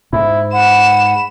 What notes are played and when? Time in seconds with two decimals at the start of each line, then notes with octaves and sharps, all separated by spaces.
0.13 G#2 E4
0.53 F#5 B5 E7